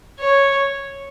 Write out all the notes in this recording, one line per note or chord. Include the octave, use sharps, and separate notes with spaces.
C#5